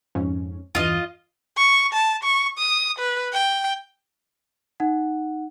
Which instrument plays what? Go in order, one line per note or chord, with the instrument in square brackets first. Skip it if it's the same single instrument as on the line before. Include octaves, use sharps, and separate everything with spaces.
[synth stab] F2 G#2 C#4
[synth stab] E2 G2 E3 [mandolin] F4 D#5
[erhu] C#6
A5
C#6
D#6
B4
G5
[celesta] D#4 F#5